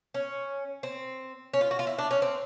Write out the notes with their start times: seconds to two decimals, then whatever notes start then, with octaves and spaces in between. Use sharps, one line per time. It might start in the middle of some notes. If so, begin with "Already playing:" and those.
0.14 C#4
0.83 C4
1.54 C#4
1.61 F4
1.71 F#4
1.79 F4
1.87 E4
1.98 D4
2.11 C#4
2.22 C4